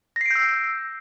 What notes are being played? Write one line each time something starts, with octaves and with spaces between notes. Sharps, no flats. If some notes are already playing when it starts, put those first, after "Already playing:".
E6 G6 A#6 C7 D7